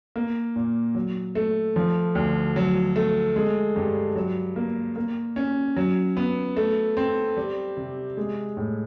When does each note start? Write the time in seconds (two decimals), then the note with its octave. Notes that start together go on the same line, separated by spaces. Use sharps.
0.16 A#3
0.56 A#2
0.95 F#3
1.35 A3
1.76 F3
2.15 D2
2.56 F#3
2.96 A3
3.36 G#3
3.76 G2
4.16 F#3
4.56 A#3
4.96 A#3
5.36 C#4
5.76 F#3
6.17 B3
6.57 A3
6.97 C4
7.37 G3
7.77 C3
8.17 G#3
8.57 A2